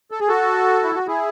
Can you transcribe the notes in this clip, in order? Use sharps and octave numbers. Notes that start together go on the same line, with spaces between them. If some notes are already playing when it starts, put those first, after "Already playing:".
A4
G#4
F#4 A4
E4
F#4
E4 G#4